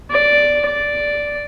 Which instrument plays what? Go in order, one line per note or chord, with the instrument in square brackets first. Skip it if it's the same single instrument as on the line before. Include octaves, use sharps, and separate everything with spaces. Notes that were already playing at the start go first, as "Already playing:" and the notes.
[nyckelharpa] D5
D5